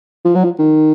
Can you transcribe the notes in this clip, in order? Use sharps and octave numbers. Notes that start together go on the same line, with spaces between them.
F3
F#3
F3
D#3